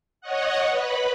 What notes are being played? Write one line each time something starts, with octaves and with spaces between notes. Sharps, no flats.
C#5 D#5 F#5
B4 B5